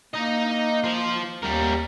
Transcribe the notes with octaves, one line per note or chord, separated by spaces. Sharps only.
A#3 D#4 D#5
F4 C5
D#2 G3 A#4